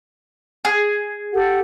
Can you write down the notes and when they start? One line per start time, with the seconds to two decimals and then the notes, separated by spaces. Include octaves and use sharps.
0.65 G#4
1.33 G4 A4 F#5